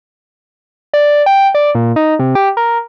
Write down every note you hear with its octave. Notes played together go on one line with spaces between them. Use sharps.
D5
G5
D5
A#2
D#4
C3
G4
A#4